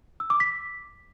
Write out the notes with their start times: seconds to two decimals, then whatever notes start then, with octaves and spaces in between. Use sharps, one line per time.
0.20 E6
0.30 D6
0.40 B6